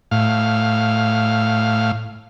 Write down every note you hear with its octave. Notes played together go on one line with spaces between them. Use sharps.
A2 F5